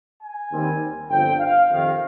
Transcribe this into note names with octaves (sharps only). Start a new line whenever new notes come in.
G#5
D#2 D#3 G3 C4
G1 F2 D3 F3 C4 G5
F5
F2 C3 D#3 F5